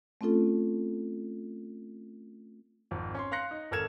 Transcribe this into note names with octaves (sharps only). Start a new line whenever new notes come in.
A3 C4 C#4 F4 A4
G#1 F2
C#4 C6
F5 C6 F#6 A#6 C#7
D#4
G#1 A4 A#4 G#6 E7